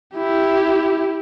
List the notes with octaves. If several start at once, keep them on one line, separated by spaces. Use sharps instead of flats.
E4 G4